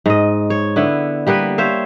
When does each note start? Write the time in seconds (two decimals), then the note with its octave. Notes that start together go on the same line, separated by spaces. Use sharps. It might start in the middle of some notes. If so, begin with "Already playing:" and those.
0.06 G#2 D#5
0.50 C#5
0.76 D3 B3 E4
1.27 G3 A#3 B3 B4
1.58 C5 C#5 E5 F5